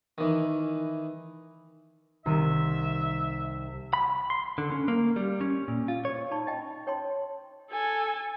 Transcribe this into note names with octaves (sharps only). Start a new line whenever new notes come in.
D#3 E3
C2 D#3 E5 D#7
B5
C6
D3
C#4
A#3
G3
C#4
A#2
F4
C#5
D#4 D5 A5 B5 C#6
D#5 E5 G5 A5
C#5 G5 A5 C6
A4 G#5